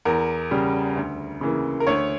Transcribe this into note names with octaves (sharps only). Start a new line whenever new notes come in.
E2 A#4
C#3 G3
D2
C#3 E3 A#3
A#4
D2 C#5